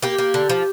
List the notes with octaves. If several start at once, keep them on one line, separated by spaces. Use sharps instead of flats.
A#3 G4
A#3
D3
F3